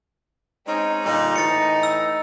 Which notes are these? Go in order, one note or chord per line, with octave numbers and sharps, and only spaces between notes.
G#3 C4 C#4 D#4
A#2 D3 G3 D#4
A2 E3 A6 C#7
E6